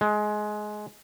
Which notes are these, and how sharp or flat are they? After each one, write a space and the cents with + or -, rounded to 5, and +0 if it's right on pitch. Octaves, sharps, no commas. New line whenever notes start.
G#3 +20